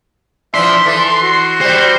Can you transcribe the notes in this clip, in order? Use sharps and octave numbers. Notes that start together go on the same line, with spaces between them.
E3 F3 D4 E5 C6
E3 A4
F#4
G3 C4 C5